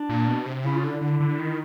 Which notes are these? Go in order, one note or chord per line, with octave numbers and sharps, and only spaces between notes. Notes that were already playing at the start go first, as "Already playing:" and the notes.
Already playing: D4
A#2
B2
C3
C#3 E4
F4
D3 E4
D3
D3
D#3